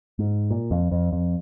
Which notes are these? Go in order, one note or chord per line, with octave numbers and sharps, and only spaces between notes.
G#2
A#2
F2
F2
F2